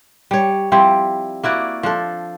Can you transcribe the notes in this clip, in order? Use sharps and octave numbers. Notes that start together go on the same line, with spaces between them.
G3 C#5
F3 G3 C4 E4
A#3 E4 F#4 D5
F3 D4 A4